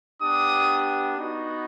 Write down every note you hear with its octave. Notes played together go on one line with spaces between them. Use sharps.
B3 D4 G4 D#6
B3 D#4 F#4